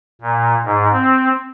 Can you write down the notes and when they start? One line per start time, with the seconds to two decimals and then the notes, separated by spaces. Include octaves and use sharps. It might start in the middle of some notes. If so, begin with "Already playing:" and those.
0.21 A#2
0.64 G#2
0.93 C4